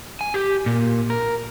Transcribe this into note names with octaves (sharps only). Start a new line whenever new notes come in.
G#5
G4
A#2
A#4